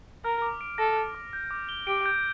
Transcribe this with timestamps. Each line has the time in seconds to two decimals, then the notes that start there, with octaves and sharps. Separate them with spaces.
0.24 A#4 F6
0.42 D6
0.61 D7
0.78 A4 A#6
0.97 F6
1.15 D6
1.33 G6
1.51 D6
1.69 G7
1.87 G4 D7
2.06 G6